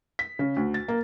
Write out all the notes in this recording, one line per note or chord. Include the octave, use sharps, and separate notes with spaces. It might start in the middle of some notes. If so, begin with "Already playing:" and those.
B6
C#3
D2
A6
A#3